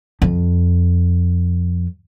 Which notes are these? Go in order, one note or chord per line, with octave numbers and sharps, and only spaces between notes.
F2